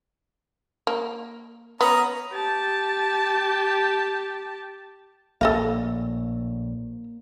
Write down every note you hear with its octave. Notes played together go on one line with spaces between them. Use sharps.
A#3
B3 C#4 A#5 D#6
G4 A5
A#1 A2 A#3 A4 D#5 F5